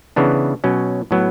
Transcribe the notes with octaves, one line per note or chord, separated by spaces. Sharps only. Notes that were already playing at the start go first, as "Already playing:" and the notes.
C#3 E3 B3 D4
B2 F#3 C#4
A2 F#3 B3